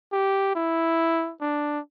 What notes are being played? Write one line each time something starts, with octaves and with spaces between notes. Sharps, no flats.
G4
E4
D4